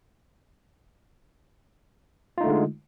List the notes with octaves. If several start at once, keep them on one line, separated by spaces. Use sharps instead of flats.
D3 G#3 A3 D#4 F4